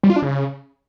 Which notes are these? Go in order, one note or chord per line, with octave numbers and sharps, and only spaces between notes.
G3
F4
D4
C#3